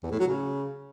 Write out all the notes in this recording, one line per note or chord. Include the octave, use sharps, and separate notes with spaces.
E2
A2
F#3
C#3